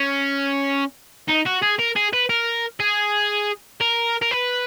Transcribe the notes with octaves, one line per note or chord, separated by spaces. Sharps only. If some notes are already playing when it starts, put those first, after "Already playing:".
Already playing: C#4
D#4
F#4
G#4
A#4
G#4
B4
A#4
G#4
A#4
A#4
B4